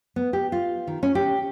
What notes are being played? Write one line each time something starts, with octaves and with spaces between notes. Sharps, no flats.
B3
G4
F4
D#3
C#4
G4